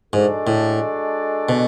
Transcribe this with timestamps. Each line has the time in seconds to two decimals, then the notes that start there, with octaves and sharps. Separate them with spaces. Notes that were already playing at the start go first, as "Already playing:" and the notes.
0.13 G#2 G#3 D4 F#4 A4 D5
0.47 A2
1.49 B2